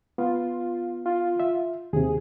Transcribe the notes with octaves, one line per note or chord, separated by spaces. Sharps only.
B3 F4
F4
E5
D#2 C3 G#4